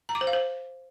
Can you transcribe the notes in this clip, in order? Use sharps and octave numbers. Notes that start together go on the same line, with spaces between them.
A#5
D6
C5
F5
C5